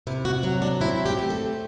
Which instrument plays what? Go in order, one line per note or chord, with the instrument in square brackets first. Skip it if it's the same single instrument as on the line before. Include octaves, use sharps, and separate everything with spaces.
[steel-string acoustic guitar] C3 E4
F#4
F#3 F#4
D4
C4 E4
G4
A3
A4